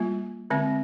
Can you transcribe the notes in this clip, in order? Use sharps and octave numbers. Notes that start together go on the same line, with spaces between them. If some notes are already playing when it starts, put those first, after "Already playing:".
Already playing: G3 A#3 F4
D3 G#3 C4